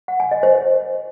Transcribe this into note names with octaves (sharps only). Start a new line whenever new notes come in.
F#5
G#5
D#5
C5